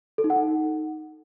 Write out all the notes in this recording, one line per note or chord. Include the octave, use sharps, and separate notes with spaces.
A4
D#4
F#5
D#4